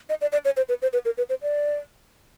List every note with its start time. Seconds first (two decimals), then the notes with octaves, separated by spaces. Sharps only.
0.09 D#5
0.21 D5
0.32 D5
0.45 C#5
0.57 C5
0.69 B4
0.82 C5
0.93 B4
1.05 A#4
1.18 B4
1.29 C5
1.42 D5